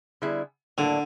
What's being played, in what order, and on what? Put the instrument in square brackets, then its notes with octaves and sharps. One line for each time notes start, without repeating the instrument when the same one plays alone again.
[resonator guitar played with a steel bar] D3 G3 B3 E4 G#4
[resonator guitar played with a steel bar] A2 F#3 A#3 D4 [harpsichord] D3